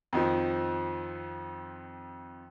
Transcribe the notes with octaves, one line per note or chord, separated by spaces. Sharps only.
F2 D#3 F3